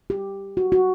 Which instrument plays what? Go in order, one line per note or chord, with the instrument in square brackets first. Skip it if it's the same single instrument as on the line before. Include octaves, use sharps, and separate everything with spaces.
[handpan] G4
F#4
F#4